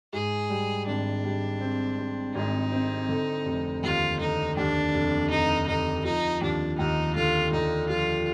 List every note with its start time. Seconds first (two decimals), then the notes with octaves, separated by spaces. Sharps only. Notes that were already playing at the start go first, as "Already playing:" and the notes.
0.13 G#2 G#4
0.50 G3
0.87 G#1 D4
1.24 G3
1.61 C4
1.98 C4
2.34 G#1 D#4
2.72 C4
3.09 D3
3.45 F1
3.83 D#2 F4
4.20 D3 D#4
4.56 D#2 D4
4.94 F1
5.30 F1 D#4
5.67 D3 D#4
6.04 F3 D#4
6.41 D#2 D4
6.78 D#2 D#4
7.15 D3 F4
7.52 D3 D#4
7.89 F3 F4